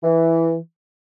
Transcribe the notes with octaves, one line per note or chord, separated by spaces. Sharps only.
E3